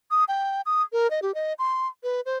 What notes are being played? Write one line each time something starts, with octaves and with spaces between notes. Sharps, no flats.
D#6
G5
D#6
A#4
D#5
G4
D#5
C6
B4
C5